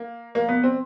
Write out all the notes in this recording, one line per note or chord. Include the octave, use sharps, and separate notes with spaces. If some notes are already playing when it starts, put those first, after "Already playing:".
Already playing: A#3
A#3
B3
C4